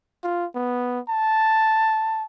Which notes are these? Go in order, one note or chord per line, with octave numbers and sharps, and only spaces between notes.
F4
B3
A5